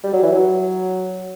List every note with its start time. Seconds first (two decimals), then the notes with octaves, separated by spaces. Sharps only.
0.04 G3
0.13 F#3
0.23 E3
0.32 F#3